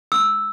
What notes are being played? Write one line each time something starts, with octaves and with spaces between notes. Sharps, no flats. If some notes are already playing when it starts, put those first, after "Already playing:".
E6